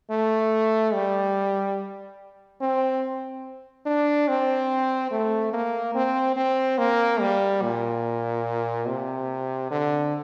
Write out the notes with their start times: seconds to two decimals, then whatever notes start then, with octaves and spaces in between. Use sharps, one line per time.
0.10 A3
0.94 G3
2.61 C4
3.86 D4
4.28 C4
5.12 A3
5.53 A#3
5.95 C4
6.37 C4
6.79 A#3
7.20 G3
7.62 A#2
8.88 C3
9.71 D3